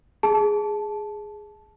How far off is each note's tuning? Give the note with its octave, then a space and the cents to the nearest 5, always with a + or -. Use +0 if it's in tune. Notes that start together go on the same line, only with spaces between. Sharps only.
G#4 +0 A5 -10